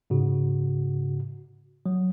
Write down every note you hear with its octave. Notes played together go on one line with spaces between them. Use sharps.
G#2 C#3 F#4
F#3